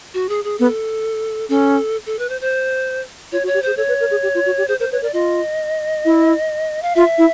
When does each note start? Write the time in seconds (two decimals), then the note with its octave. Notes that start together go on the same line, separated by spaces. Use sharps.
0.14 F#4
0.29 G#4
0.44 G#4
0.58 B3 A4
1.49 C#4 A4
2.06 A4
2.19 B4
2.29 C5
2.41 C5
3.32 F4 C#5
3.43 F#4
3.47 C#5
3.54 G4
3.63 G#4 C5
3.77 A4 C#5
3.88 B4
4.00 A#4
4.11 G#4
4.23 G4
4.34 F4
4.46 F#4
4.58 G4
4.68 G#4 C5
4.80 A#4 C5
4.92 B4 C#5
5.02 A#4 D5
5.13 F4 D#5
6.05 E4
6.82 F5
6.95 F4 E5
7.18 E4